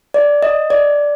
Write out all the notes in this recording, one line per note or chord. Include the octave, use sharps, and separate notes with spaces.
D5
D#5
D5